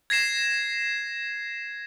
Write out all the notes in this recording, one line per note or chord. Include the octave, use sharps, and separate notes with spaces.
G#6 A#6 C7 E7